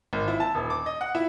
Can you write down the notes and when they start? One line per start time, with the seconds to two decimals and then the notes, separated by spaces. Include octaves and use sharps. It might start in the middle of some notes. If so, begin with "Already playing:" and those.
0.13 G#1
0.28 E4
0.40 A5
0.55 D#1
0.70 D6
0.86 D#5
1.01 F#5
1.15 E4